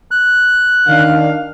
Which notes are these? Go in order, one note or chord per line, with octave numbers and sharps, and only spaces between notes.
F#6
D#3 D4 F5